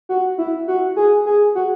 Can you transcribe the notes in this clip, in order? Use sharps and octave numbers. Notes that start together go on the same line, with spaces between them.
F#4
E4
F#4
G#4
G#4
F#4